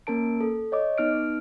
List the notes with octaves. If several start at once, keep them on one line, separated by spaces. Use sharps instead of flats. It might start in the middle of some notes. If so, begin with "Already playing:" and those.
A#3 C#4 A#4 A5 D7
A4
C#5 D#5 D6
B3 D#4 F6 D7